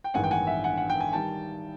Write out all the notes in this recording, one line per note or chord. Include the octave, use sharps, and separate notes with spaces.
G5
A1 G2 D#3 G#3 B3 F#5 G#5
G5
F#5 G#5
E5 F#5
F#5 G#5
F#5
G5
G#5
D#3 G3 G5 A5